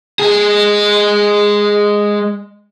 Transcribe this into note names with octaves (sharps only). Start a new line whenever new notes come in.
G#3 G#4